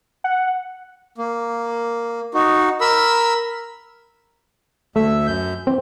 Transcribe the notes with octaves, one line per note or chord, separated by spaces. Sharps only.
F#5
A#3
D#4 F#4
A#4 B5 E6
D2 A3 E5 E6
F#2 G6
E3 C4